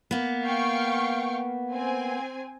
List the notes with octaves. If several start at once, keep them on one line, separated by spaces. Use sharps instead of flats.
A#3 B3
F5 G5 C#6
C4 G#5